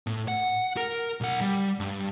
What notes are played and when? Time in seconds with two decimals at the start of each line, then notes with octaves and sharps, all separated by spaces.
0.07 A2
0.28 F#5
0.77 A#4
1.21 B1 F#5
1.41 G3
1.80 G2